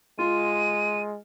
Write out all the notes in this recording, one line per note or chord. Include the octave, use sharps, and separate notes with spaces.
G#3 F4 D#7